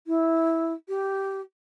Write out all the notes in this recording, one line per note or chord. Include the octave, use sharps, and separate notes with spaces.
E4
G4